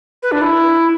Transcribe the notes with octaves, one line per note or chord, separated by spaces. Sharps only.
B4
D4
E4